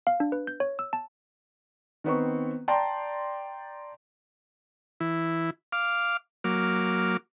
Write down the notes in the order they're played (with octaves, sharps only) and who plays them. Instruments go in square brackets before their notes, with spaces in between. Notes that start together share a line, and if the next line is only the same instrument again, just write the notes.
[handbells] F5
D4
B4
G6
C#5
E6
A5
[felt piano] D#3 B3 C4 C#6
D5 G5 A5 A#5 C6
[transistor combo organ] E3 E4
F5 D6 F6
F#3 A#3 D6 F6